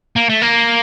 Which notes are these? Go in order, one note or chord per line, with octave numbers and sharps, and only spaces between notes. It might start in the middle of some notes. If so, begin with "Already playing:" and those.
A#3
A3
A#3